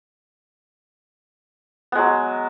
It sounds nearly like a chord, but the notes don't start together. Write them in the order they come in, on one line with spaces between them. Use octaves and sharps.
B3 G#3 F#3